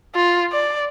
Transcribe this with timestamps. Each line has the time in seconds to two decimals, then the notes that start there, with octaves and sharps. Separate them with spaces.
0.15 F4
0.52 D5